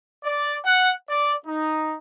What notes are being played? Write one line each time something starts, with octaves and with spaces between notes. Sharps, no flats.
D5
F#5
D5
D#4